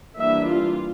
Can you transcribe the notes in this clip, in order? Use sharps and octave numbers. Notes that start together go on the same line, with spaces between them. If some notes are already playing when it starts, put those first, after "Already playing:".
E3 G3 A#3 D4 E5
F4